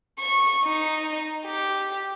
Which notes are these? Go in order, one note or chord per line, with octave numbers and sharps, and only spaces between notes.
C#6
D#4
G4